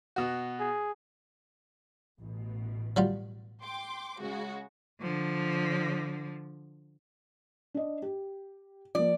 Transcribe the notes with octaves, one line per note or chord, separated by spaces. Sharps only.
B2 F#4
G#4
A1 B2
F#3 G3 F4
G5 C6 D6
C#3 G#3 F#4
D3 F3
D4 D#5
G4
F3 A#3 D5